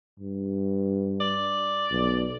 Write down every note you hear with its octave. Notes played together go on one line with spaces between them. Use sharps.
G2
D5
B1